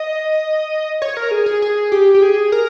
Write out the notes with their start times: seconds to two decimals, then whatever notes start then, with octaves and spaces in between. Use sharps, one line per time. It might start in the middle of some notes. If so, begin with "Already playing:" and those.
Already playing: D#5
1.02 C#5
1.17 A#4
1.31 G#4
1.46 G#4
1.62 G#4
1.92 G4
2.14 G4
2.22 G#4
2.52 A#4